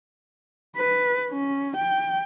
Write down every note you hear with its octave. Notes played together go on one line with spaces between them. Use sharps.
B4
C#4
G5